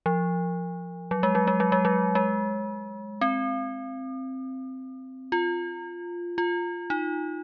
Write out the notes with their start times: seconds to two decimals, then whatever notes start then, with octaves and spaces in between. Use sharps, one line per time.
0.06 F3
1.11 F#3
1.23 G#3
1.35 F#3
1.47 G#3
1.60 F#3
1.72 G#3
1.85 F#3
2.15 G#3
3.21 C4
5.32 F4
6.38 F4
6.90 D#4